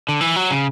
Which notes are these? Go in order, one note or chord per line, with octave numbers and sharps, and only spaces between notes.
D3
E3
F#3
C#3